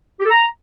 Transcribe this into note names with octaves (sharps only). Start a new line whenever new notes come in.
G4
A4
A#5